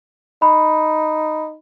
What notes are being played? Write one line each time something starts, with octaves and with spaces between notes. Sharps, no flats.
D#4 B5